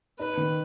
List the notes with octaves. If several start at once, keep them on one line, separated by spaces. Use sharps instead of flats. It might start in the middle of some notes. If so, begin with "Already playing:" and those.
D#4 B4
D#3